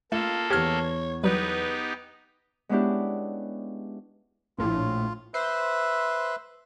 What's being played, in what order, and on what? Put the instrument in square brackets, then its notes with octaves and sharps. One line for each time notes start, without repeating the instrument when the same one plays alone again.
[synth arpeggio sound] A3 [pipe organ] A#3 A4 [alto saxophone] F4 [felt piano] E7
[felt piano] E2 G#6 [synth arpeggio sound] G4 F6 [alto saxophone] C#5
[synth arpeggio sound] F#3 G3 [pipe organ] B3 D#4 G4 [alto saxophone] B4
[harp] G#3 B3 C#4 D4 E4 G4
[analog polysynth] A#1 A2 [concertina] F4
[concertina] B4 E5 [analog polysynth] C5